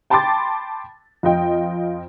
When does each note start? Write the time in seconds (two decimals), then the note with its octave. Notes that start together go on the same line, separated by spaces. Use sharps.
0.10 G5 A5 B5 C6 D6 A6
1.23 F2 F4 D#5 G5